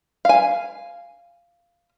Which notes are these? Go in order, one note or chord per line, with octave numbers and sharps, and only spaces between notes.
F5 G#5